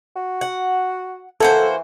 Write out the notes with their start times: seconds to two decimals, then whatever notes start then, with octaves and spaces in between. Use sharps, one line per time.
0.16 F#4
0.41 F#5
1.40 E3 A#3 F#4 A4 C5